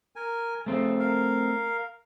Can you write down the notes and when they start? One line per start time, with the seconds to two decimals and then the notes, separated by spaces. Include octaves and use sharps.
0.16 A#4 G#5
0.66 C#3 A3 C4
0.99 A#4 F5